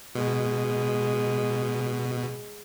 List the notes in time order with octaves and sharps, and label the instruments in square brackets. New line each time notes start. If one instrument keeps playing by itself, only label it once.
[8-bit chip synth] B2 [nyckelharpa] G#3